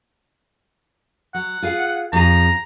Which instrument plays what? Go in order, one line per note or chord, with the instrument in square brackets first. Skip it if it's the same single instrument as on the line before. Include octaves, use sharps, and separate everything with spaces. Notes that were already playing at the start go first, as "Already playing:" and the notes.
[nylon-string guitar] F#3 [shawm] F#5
[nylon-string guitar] F4 G#4 F5
[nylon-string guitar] F2 G#4 [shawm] A#5